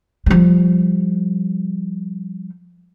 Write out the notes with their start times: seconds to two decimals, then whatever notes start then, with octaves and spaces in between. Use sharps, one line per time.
0.26 F3 G3